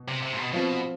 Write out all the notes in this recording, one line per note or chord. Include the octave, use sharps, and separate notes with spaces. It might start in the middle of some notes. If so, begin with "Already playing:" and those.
Already playing: B2
C3
C3
G#2
B2
B2 F3 C4 F4